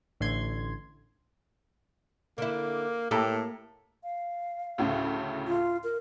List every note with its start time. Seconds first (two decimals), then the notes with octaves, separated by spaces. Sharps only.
0.20 A1 D3 A3 C6 G#6
2.38 D3 A#3 E4
3.11 A2 A#3 G4 A4 A5 A#5
4.03 F5
4.78 D2 A2 C#3
5.47 F4
5.84 A#4